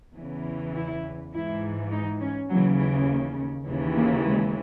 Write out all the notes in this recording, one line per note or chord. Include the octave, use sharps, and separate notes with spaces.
E2 C#3 E3
E4
G#2 E3 E4
D#4
C#4
D#2 C#3 E3 F#3
E3
D#2 C#3 E3
A#3
G#3